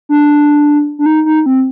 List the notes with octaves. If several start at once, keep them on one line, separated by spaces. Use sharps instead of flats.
D4
D4
D#4
D#4
C4